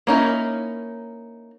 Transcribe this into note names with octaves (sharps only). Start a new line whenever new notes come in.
A#3 C#4 D#4 E4